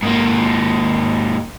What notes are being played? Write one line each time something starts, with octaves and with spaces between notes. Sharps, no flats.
G#2 A#3